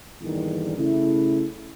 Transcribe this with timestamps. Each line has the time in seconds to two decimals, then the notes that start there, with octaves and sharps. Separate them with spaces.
0.21 E2 G2 A#2 D3 D#3
0.77 C#3 A3 E4